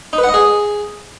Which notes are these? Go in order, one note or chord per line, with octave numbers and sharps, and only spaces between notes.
D#4
B4
F#5
D#5
G#4